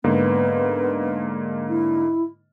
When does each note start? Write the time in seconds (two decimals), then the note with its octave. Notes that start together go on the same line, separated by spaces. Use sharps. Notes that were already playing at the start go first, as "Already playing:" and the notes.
0.04 G#2 D3 A#3 B3
1.69 E4